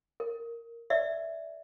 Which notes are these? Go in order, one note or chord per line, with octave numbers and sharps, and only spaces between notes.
A#4
D5 E5